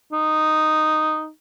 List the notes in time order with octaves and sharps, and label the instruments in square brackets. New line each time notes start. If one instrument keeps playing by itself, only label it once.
[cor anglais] D#4